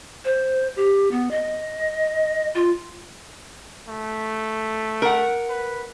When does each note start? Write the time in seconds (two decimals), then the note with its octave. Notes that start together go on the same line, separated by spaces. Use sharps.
0.25 C5
0.76 G4
1.11 B3
1.31 D#5
2.55 F4
3.88 A3
5.02 A#4 F#5
5.49 B4